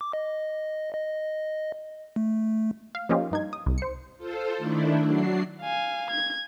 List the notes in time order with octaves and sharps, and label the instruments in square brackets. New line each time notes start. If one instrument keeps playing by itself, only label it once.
[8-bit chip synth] D6
D#5
D#5
A3
[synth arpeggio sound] F5
F3 A#3 C#4 D#4 F4 G4
G2 D#4 G#6
D#6
C2
C5 C#7
[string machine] F4 A4 C5
D#3 A3 D4 E4
F#3 D4 F#4 C7
[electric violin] F5 G#5
G#6